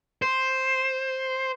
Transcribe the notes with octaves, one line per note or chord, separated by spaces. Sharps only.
C5